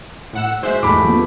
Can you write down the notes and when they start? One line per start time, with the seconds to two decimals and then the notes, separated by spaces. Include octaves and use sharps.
0.33 A2 F#5 E6
0.63 G#3 F#4 C5 E5
0.83 E2 G#2 A3 E4 G4 B5 D6
1.04 F3 B3